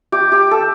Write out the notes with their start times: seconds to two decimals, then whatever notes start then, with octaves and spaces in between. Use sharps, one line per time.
0.12 G4
0.32 G4
0.51 A4